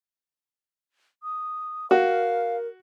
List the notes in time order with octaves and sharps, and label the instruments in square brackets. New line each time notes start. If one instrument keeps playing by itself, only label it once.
[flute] D#6
[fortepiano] F#4 [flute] A#4 [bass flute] F5